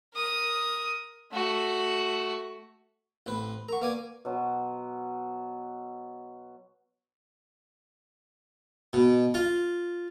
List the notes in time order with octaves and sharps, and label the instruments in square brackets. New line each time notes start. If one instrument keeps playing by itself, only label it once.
[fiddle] A#4 D#6
A3 F#4
[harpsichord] A1 C4 B4
[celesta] A#4 F#5 [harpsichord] A#5 C#6
[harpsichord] A#3 D5 G#5 [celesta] B4
[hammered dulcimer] B2 F#3 C5
[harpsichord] B2
F4